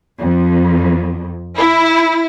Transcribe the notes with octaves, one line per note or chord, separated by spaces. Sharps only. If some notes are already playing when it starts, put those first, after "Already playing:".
F2
E4